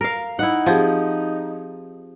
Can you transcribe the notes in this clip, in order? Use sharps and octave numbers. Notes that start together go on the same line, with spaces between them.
A#4 F5
D#4 E4 F#5
F3 C4 G4 G#4